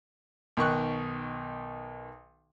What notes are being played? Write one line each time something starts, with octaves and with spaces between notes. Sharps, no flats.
B1 D#3 C#6 F#6